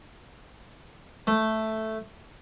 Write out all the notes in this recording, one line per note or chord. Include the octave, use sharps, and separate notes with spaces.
A3